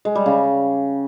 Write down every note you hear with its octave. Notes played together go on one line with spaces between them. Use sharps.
G#3
G3
C#3